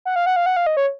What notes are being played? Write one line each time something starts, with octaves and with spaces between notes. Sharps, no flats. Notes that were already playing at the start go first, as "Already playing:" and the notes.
F#5
F5
F#5
F5
F#5
F5
D#5
C#5